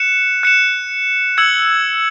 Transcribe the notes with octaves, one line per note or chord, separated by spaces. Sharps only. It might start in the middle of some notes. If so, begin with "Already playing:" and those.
Already playing: F#6 C#7 E7
F#6 C#7 E7
E6 G#6 C#7 F#7